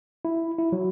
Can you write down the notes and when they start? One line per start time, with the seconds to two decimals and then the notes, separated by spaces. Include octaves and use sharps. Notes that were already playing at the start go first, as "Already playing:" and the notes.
0.25 E4
0.58 E4
0.72 F#3